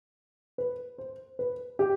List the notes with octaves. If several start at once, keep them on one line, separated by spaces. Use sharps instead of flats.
B4
C5
B4
G4